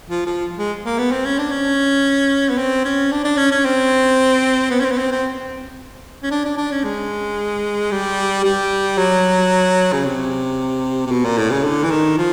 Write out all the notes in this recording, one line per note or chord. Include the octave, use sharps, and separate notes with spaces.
F3
F3
G#3
A#3
B3
C4
C#4
D4
C#4
B3
C4
C#4
D4
D4
C#4
C#4
C4
B3
C#4
C4
B3
C4
C4
C#4
D4
D4
D4
C#4
G#3
G3
G3
F#3
C#3
C3
C3
B2
A#2
A2
C#3
D3
E3
D#3
F3